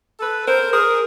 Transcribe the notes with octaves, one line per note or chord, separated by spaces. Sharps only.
A4 B4
A#4 C5
G#4 A#4